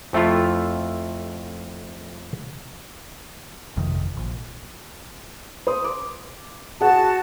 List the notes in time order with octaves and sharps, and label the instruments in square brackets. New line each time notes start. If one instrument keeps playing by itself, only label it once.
[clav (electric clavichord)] F2 A3 E4 F4
[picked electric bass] G1 F2 C3 D#3
A#1
[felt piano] C5 C6 D#6
D6
[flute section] F#4 A5 [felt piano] G#4 F#5